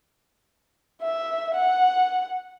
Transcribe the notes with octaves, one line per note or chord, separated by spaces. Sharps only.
E5
F#5